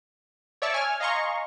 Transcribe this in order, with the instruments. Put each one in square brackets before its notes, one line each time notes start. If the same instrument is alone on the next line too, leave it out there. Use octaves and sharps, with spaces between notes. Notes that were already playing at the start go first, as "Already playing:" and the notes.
[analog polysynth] C#5 D5 E5 A5 C#6 E6
G#5 F6
D#5 F5 G#5 A#5 C6 C#6